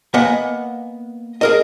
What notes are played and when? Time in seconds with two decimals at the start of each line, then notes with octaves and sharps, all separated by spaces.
0.14 A#3 B3 D#5 F#5 G#5
1.41 G#4 A#4 D#5